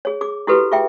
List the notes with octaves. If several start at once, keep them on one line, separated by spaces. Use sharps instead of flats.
G#4 C#5
G#4 D6
E4 F#4 G4 A4 B4
F4 G#4 E5 G5